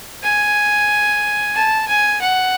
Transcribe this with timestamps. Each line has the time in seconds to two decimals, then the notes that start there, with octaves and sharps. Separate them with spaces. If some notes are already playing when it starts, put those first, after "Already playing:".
0.23 G#5
1.55 A5
1.88 G#5
2.21 F#5